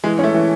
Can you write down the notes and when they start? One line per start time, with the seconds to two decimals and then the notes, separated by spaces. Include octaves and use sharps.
0.04 E3 G#3
0.19 A3 C#4
0.34 E3